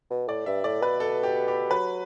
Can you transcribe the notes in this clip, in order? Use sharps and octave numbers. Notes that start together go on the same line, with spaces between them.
B2
A2 D5
G2 E5
A2 D5
B2 B4
A4
G4
G4
F#3 B4